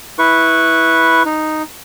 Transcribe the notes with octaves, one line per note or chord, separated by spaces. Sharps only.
E4 B4 C#6
D#4